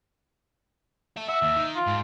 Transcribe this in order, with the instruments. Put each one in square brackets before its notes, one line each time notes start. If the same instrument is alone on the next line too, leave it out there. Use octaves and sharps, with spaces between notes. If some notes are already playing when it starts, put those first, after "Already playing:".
[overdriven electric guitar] A4 E5
[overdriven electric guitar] F#4 [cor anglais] E5
[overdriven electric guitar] D#2
D#3
[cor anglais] F4
[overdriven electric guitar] G#2